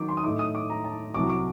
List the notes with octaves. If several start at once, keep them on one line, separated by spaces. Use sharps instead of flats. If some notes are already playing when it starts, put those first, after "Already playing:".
Already playing: D#3 F#3 D6
C6
D#6
A2 A3 D#4 D6
D#6
D6
A#5
A5
C2 C3 F#3 D6
D6